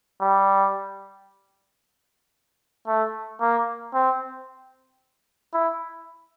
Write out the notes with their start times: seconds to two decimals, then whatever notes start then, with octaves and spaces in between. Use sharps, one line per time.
0.21 G3
2.87 A3
3.41 A#3
3.94 C4
5.54 E4